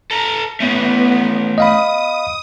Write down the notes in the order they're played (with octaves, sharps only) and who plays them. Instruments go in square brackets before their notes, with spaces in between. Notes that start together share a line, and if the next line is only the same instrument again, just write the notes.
[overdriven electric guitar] A4 A#5
[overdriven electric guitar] A3 C#4 [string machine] B3
[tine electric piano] D#5 F5 B5 [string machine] D#6